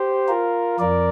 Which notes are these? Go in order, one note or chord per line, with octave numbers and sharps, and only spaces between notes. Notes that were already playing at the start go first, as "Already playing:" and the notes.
Already playing: G4 C5
F4 A#4
F2 A#4 D5